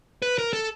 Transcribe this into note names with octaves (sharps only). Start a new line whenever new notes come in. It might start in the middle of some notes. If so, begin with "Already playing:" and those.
B4
A#4
A4